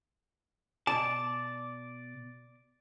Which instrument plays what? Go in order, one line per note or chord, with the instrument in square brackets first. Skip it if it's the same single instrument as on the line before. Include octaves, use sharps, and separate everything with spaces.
[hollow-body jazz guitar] B2 A5 [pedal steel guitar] D5